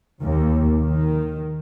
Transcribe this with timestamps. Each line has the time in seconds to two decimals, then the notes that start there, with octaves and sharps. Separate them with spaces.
0.21 D#2
0.82 D#3